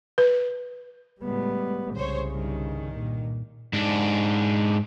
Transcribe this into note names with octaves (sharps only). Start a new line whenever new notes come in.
B4
C#2 A2 G3 B3
C2 C#3 C5 C#5
G2 D#3
A#2
G#2 D4